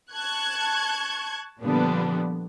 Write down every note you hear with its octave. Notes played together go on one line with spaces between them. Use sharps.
A5 C#6 F#6 G#6
A#2 D3 F3 G3 B3 D4